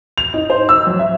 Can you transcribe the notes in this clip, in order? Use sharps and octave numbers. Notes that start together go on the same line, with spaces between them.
F7
D#4
C5
E6
F#3
E5